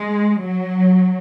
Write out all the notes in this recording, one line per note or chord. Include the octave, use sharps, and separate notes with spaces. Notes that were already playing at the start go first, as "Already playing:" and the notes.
Already playing: G#3
F#3